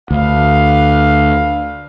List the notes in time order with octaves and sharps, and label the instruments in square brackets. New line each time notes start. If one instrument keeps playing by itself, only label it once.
[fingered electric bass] D2 [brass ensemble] D4 B4 F5